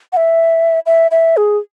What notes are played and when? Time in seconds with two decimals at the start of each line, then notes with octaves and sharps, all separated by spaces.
0.13 F#5
0.17 E5
0.86 E5
1.11 E5
1.37 G#4